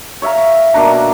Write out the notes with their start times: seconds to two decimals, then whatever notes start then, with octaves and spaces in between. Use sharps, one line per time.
0.22 C#5 E5 F5 A#5
0.74 B2 A#3 D4 A#5